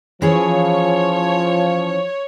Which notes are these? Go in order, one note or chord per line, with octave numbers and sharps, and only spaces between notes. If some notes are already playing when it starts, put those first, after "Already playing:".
E3 F3 C#4 G#4 C#5